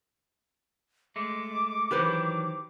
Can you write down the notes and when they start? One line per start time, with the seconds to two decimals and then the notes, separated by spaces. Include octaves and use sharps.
1.16 G#3 A3 D6
1.91 D#3 E3 F#3 G4 B4 C5